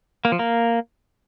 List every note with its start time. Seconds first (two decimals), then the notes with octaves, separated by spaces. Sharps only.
0.25 A#3
0.32 F3
0.39 A#3